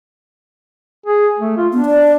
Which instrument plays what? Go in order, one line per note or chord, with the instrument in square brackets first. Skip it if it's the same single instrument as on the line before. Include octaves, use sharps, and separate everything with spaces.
[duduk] G#4
A3
F4
[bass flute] B3 [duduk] D4
[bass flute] D5